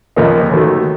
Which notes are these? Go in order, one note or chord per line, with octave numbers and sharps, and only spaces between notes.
D#2 C#3 F3 A#3 D#4
D#2 D#3 F#3 A3